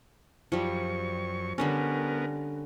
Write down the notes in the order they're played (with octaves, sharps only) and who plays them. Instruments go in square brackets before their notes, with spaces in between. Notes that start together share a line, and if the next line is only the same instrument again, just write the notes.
[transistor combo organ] F#2 C#6 [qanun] F3 G3
[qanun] D3 G3 C#4 [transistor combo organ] B3 A#4